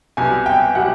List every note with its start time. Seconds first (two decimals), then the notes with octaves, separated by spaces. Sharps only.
0.17 C2 B2 G3 G#5
0.46 G5
0.75 B2 G3 F#5